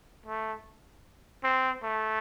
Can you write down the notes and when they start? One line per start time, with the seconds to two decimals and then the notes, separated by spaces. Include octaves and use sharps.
0.26 A3
1.44 C4
1.84 A3